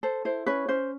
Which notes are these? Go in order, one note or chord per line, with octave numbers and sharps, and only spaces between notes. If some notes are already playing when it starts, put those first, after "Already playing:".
A4 C5
E4 C5
C#4 B4 C#5
C#4 C5